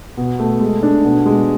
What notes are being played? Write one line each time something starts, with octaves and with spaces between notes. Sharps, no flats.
B2
A3
G#3
D4
B2
G#3